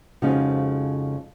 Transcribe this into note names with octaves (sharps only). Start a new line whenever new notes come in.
F2 C#3 F3 G#3 D#4 F#4